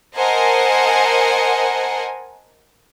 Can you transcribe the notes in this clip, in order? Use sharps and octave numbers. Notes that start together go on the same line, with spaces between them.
A#4 C5 D#5 F#5 G#5 A5